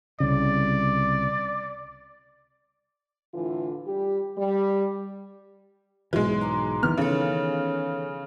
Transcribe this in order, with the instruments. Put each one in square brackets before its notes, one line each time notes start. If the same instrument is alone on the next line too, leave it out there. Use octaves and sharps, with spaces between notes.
[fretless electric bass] C2 C#3 [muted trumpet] D5
[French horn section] A2 D3 E3 F4
G3 G4
G3
[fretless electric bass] B1 G#2 E3 [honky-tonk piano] F#3 G#3
[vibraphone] A#5 C6 D6
[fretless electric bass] D#3 E3 B3 [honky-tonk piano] F6
[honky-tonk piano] C#3 [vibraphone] A4 C#5